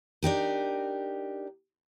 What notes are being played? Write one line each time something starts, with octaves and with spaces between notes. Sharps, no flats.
D4 D#4 G4 A#4